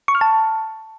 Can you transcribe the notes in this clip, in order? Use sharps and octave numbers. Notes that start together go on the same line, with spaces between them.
C#6
F6
A5